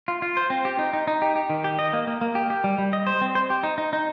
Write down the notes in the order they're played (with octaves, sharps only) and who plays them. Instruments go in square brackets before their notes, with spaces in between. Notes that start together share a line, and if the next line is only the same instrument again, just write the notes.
[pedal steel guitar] F4
F4
C5
C4
G4
D#4
D#4
D#4
G4
G4
D#3
G4
D#5
A#3
A#3
A#3
G4
G4
G3
G3
D#5
C5
C4
C5
G4
D#4
D#4
D#4